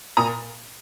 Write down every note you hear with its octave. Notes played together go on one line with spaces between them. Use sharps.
A#2 A#5 D#6